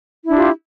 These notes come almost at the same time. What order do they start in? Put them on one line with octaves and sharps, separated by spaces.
E4 D4 G4 F4